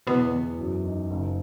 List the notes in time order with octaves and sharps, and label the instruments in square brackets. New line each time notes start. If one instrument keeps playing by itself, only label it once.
[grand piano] E2 [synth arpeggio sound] B2 B3
[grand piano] E2
F#2
D#4
F#1